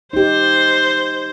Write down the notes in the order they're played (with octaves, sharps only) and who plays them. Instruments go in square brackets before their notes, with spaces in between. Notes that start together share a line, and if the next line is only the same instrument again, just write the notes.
[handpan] D#4 G4 [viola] C5